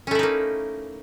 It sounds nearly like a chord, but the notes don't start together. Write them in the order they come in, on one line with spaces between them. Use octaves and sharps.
C#4 A3 E4 D#4 A#3